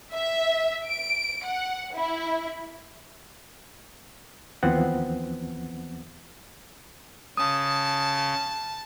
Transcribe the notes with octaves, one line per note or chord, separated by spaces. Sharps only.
E5
D7
F#5
E4
D#2 E3 F3 B3 C4 F#5
C#3 A5 D#6